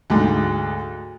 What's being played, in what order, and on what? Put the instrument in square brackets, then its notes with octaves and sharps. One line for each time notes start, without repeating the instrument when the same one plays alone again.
[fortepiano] D2 G#2